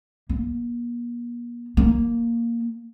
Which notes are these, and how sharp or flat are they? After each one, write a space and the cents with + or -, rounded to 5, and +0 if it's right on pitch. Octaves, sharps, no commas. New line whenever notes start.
A#3 +40
A#3 +0